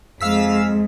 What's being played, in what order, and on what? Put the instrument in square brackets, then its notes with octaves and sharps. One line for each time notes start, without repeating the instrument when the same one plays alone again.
[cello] F2 [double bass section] G#3 [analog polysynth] F5 E6 B6